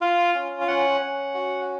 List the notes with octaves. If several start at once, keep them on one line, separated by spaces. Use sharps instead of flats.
F4 F5
C#4
F5
C#4 F#5
C#4
F#4